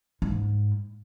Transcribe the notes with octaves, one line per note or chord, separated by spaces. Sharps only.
G#2